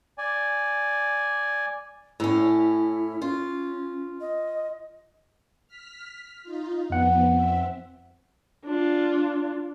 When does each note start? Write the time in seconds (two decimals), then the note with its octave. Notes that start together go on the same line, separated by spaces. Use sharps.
0.18 D5 G#5
2.20 A2 C#4 E4
3.22 C#4 F4
4.21 D#5
5.67 F6 B6
6.43 D#4 F4
6.90 F2 F3 B3 F#5
7.30 C4 E5
8.65 D4 F4